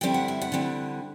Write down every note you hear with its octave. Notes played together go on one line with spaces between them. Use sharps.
D3 G3 C4 E4 G5
F#5
E5
F#5
D3 G3 C4 E4